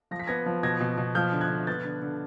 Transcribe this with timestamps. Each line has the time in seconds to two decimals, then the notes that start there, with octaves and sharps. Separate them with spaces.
0.11 F3 A#6
0.19 B6
0.27 B3 G#6 A#6
0.46 F3
0.63 B2 G#6 A#6
0.80 B2
0.98 B2
1.15 F3 F6 G6
1.32 D3
1.41 F#6 G#6
1.50 D3
1.67 B3 G6 A6
1.85 D3
2.02 D3